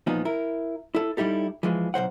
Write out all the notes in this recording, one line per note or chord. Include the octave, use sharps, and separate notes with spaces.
E2 A#2 F3 B3 D#4
E4 A#4
E4 A4
G3 D#4 E4 G4 A4
E3 F3 G#3
B1 G2 C5 F#5